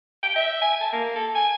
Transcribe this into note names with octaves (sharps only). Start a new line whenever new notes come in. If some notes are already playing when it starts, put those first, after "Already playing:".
G5
E5
G#5
A5
A#3
A4
G#5